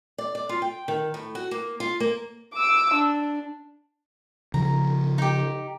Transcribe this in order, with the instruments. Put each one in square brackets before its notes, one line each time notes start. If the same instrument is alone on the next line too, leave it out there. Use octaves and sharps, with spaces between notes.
[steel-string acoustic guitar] D5
D5
F4
G5
D#3
A2
F#4
A#3
F4
A#3
[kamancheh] D6 E6
D4
[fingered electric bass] C#3 F3 [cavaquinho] A#5
[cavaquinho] D#4 G4